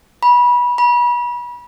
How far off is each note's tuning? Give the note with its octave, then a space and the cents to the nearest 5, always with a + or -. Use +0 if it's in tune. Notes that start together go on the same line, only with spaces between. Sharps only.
B5 -25
B5 -35